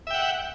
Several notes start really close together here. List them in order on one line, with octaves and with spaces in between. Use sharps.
E5 G5 F#5